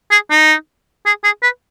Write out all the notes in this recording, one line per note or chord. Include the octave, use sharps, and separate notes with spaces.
G#4
D#4
G#4
G#4
B4